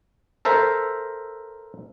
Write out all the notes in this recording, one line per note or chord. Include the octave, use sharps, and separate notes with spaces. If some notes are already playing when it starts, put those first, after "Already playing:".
A4 A#4 C5 E5